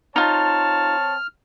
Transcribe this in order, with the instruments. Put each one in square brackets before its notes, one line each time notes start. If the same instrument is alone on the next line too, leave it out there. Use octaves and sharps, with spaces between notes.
[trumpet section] C4 C#5 A5 [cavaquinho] D#4 F4 [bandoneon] F6